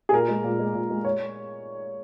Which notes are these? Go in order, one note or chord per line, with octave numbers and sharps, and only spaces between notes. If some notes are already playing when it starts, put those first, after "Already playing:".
G#4
A#2 A#4
G#3
A#2
G#3
A#2
G#3
C#5